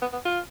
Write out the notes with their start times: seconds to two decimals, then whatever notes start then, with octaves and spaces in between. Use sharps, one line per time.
0.02 B3
0.13 B3
0.25 F4